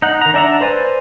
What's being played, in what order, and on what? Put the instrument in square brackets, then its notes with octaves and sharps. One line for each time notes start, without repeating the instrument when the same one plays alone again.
[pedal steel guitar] D#4 F#5
D#3 A#5
D4 D5 E5 F#5 A#5
B4 C5 D5 G#5